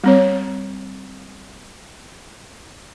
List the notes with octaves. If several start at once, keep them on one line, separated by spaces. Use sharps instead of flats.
G3 C4 C#5